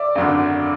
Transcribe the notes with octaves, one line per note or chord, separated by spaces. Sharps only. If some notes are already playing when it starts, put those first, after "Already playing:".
Already playing: D5 E5
G#1 F#2 D3